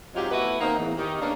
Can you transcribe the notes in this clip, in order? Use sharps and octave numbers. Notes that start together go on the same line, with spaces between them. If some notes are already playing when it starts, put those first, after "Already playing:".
G#2 F#3 G#3 C4 F4 G4
A3 B3 E4 F#4 B4
D#3 A#3 C4 D#4
E2 A2 E3
D#3 D#4 G4
C#3 A#3 B3 C#4 D4